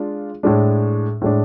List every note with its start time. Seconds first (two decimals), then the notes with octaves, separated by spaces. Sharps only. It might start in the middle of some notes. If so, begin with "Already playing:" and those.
Already playing: G#3 D4 F4
0.43 A2 G#3 D4
1.22 A2 G#3 D4